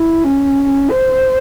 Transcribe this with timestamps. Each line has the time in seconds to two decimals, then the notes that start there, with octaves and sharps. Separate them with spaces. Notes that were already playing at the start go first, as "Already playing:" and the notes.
Already playing: E4
0.23 C#4
0.90 C5